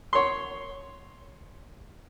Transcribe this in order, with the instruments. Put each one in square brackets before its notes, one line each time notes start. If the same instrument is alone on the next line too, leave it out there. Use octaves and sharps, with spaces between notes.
[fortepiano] C#5 C6